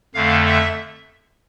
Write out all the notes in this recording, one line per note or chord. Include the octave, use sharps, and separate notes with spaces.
F2 D3 A3 F5
E5